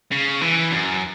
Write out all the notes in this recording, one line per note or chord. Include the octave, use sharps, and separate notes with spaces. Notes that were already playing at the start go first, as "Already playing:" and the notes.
C#3
E3
F#2